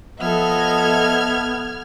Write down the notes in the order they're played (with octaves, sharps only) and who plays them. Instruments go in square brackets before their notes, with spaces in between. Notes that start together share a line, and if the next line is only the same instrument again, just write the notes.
[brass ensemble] F3 D#5 [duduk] B3 [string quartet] A4 E5 [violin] F6 G#6